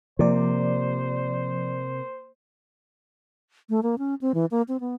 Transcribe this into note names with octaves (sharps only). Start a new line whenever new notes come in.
C3 F3 A#3 C5 D5
A3
A#3
C#4
C4
E3
A#3
C4
B3